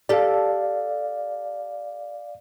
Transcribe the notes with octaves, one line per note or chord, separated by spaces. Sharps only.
G4 A4 D5 F5